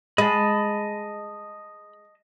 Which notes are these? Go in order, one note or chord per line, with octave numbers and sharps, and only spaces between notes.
G#3 D#5 A5 B5